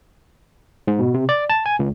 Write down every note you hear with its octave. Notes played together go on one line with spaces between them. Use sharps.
G#2
B2
C3
D5
A5
G#5
C#2